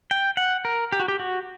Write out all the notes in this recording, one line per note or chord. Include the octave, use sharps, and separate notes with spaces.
G5
F#5
A#4
G4
F#4
G4
F#4